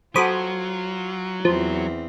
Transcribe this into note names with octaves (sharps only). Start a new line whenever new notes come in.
F#3 F4 F#4 A4 C5 B5 D6 D#6
E2 F3 C4